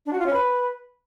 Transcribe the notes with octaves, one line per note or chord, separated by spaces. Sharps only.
D4
F#4
F4
C#4
B4